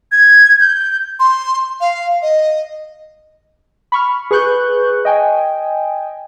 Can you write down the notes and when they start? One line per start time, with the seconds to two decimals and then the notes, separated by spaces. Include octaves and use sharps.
0.12 G#6
0.61 G6
1.20 C6
1.81 F5
2.22 D#5
3.92 B5 C#6 F6
4.31 G#4 B4 C#6 F#6 G6
5.05 D#5 G5 G#5